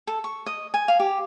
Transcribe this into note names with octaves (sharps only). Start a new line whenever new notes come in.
A4
C#6
D#5
G#5
F5
G4